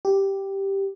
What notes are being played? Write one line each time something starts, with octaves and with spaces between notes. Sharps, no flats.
G4